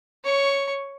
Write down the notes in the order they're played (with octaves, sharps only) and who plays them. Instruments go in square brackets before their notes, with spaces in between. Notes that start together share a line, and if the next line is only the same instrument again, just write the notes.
[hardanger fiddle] C#5 C#6